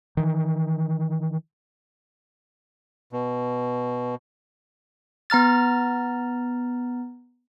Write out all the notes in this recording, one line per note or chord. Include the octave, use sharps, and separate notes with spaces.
D#3 E3
B2
B3 A#5 F6 A6